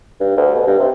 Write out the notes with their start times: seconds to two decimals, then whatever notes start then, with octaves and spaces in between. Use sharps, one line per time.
0.20 G2
0.37 D2
0.55 B2
0.67 G2
0.79 C3